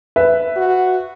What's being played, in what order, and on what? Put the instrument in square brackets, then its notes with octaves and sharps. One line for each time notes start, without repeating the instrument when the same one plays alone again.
[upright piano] B4 E5
[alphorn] F#4